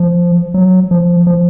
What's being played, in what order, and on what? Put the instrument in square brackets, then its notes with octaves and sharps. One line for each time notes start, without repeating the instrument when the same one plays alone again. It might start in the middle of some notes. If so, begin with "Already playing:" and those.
Already playing: [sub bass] F3
F#3
F3
F3